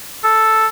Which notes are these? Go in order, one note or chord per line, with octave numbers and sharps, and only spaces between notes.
A4